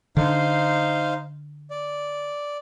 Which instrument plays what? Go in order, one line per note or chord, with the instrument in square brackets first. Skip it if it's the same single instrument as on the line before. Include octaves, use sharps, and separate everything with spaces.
[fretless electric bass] D3 [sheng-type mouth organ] D#4 C5 F5
[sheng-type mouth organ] D5